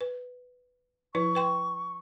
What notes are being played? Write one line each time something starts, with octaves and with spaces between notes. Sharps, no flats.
B4
F3 E4 B4 C#6
B4 G5 C6